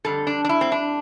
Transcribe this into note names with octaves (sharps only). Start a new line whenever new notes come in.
F2 D3 G3 A4
D4
D4
E4
C4
D4